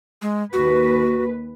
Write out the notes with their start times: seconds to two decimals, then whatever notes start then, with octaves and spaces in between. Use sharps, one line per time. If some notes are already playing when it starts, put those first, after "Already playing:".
0.22 G#3
0.53 D#2 F#4 B4